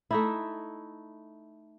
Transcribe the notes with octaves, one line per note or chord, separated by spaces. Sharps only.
A3 D#4 E4